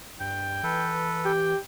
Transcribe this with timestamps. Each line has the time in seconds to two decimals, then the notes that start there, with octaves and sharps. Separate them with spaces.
0.20 G2 G5
0.63 E3 A4 B4
1.25 G4 G5